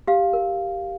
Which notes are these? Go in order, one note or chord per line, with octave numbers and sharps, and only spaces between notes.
G4 F5
A#4